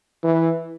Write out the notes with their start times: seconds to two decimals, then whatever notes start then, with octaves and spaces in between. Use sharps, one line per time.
0.23 E3